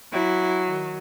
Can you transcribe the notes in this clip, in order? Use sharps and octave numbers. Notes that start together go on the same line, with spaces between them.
F#3 E4
D#3